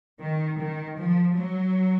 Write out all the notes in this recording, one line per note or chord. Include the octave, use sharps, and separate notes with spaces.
D#3
D#3
F3
F#3